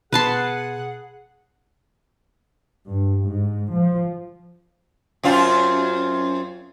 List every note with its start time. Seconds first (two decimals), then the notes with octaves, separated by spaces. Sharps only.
0.13 B2 G#4 B4 F#5 A5 C6
2.87 G2
3.25 G#2
3.72 F3
5.24 F#2 C4 F4